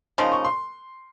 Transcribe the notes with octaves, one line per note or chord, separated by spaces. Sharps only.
C#3 F3 A#3 D#4 C6
C#6
C6